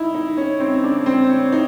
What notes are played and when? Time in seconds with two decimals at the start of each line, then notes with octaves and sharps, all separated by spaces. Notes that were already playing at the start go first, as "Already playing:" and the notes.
Already playing: D#4 E4
0.14 D#4
0.37 C#4
0.60 C4
0.84 D4
1.06 C4
1.29 C#4
1.52 D#4